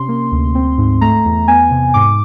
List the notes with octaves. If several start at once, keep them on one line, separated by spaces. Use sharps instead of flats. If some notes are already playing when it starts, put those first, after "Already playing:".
Already playing: C3 C#4 C6
A#3
D2
C4
G#2
A3 A#5
E2
B3 G#5
C3
G#2 D6